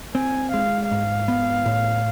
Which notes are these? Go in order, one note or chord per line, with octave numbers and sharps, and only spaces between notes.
C4 G#5
G#3 F5
G#2 F5
B3
A2